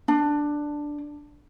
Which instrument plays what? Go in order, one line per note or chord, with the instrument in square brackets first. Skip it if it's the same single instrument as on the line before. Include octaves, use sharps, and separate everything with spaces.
[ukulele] D4